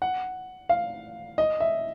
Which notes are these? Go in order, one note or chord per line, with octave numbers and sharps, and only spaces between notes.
F#5
F5
D#5
E5